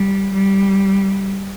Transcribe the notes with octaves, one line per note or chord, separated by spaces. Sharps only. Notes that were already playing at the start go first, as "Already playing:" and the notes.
Already playing: G3
G3